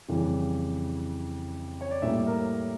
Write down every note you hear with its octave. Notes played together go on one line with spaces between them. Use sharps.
F2 C#3 E3 G3
C#5
D5
A2 G3 A#3 E5
A#4